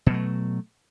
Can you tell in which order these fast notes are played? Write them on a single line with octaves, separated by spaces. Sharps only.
B2 F#3 A3